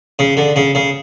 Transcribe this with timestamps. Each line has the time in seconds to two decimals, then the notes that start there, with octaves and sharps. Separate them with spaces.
0.19 C#3
0.37 D3
0.56 C#3
0.75 C#3